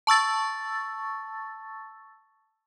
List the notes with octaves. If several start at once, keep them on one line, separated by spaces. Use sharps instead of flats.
A5 C#6 E6 A6